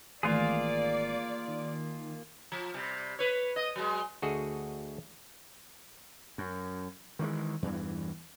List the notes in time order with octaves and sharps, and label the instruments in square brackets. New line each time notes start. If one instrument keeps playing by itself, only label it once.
[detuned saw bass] G#1 [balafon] D#3 E3 A3 [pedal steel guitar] A#3 F4 G#4 [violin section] D5
[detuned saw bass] D#3
[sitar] F3
C3 G3
B4 C#5
D#5
F#3 G#3
[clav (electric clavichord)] D2 F#4 G#4 A4 D#5
[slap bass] F#2
D#3 E3 F#3 G#3
E2 G2 E3